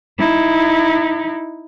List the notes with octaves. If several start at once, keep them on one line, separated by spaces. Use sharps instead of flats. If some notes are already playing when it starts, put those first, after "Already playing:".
D#4 E4